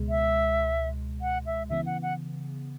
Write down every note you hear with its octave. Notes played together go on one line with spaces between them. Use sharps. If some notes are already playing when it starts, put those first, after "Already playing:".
Already playing: C#2 B2 G#3
E5
F#5
E5
C#3 E3 B3 E5
F#5
F#5